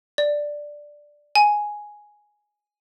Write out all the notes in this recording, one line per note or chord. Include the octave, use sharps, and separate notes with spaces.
D5
G#5